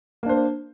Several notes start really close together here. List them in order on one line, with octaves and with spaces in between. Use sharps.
A#3 D4 C5